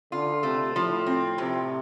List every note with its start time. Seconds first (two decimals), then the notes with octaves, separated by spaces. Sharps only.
0.12 D3 F4
0.43 C3 A3
0.75 A2 F3
1.06 C4
1.38 A2 C3